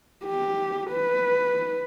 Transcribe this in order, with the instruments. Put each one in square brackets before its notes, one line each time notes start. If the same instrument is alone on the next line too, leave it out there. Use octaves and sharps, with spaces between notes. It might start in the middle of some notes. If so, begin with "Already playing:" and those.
[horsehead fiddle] G4
B4